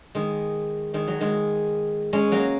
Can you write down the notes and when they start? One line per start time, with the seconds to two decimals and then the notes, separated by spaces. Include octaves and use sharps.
0.15 D#3 G#3
0.94 D#3 G#3
1.08 F#3
1.21 D#3 G#3
2.13 G#3 C#4
2.32 F#3 A#3